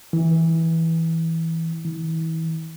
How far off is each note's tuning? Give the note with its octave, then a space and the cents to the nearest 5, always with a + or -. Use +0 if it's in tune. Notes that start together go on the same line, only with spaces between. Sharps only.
E3 -15
E3 -35